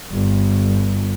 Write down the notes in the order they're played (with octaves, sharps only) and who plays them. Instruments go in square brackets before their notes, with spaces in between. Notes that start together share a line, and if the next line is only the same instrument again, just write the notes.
[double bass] G1